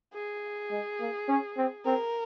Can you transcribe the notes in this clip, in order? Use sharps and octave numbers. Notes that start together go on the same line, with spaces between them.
G#4
G#3
A#3
C#4
C4
C4 A#4